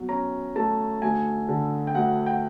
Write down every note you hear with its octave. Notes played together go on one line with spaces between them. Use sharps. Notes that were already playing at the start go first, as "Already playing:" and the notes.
Already playing: B2 F#3
C#4 A#5
A3 A5
D2 G#5
D3
G5
D2 F#5
G5